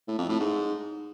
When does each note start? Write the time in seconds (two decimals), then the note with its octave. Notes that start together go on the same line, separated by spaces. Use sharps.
0.07 A2
0.18 F2
0.29 A2
0.40 G#2